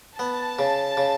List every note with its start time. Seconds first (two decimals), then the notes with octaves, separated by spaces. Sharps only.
0.19 B3 A5
0.59 C#3
0.97 C#3